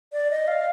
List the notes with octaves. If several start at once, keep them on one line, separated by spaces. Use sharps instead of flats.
D5
D#5
F5